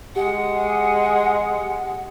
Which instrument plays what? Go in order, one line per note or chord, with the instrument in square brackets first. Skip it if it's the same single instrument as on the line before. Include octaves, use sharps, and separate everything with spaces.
[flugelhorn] G#3 [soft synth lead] G4 [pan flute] F#5